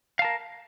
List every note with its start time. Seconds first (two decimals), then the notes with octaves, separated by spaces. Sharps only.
0.19 F5
0.22 A5
0.25 A#4